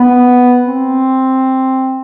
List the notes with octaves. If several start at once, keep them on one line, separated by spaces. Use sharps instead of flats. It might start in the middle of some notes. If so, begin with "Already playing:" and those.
Already playing: B3
C4